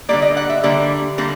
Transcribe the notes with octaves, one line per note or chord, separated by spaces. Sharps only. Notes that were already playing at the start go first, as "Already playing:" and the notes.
D3 G3 A#3 D5
D#5
F#5
E5
D3 G3 A#3
D3 G3 A#3